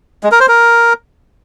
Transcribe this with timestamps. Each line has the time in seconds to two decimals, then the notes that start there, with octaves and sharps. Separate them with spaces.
0.23 G#3
0.32 A#4
0.40 C5
0.48 A#4